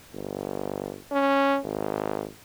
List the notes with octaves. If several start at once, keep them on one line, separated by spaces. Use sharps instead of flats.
G1
C#4
G#1